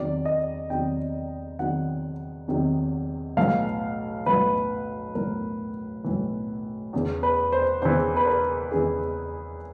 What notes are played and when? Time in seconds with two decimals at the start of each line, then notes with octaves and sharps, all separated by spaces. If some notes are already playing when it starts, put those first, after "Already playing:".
Already playing: E2 C3 D#3 F#3 D5
0.25 D#5
0.70 E2 C3 D#3 F#3 G5
1.59 E2 C3 D#3 F#3 F#5
2.48 E2 C3 D#3 F#3
3.37 B1 A2 E3 F5
4.26 B1 A2 E3 B4
5.15 B1 A2 E3 A#4
6.04 B1 A2 E3
6.93 E2 C#3 E3
7.23 B4
7.52 C5
7.82 E2 C#3 E3 C5
8.16 B4
8.27 A#4
8.71 E2 C#3 E3 G#4